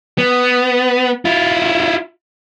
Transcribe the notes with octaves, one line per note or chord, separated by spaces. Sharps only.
B3
E4 F4